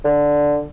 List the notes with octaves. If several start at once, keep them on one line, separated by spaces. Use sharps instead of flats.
D3